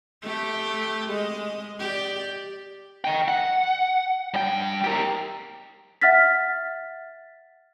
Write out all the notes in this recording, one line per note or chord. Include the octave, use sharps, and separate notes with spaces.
A3 G4
G#3 D#5
G4 D5
D#5 G5
F#5
G2 G5
G4 A#4
E5 F#5 F6 A6 B6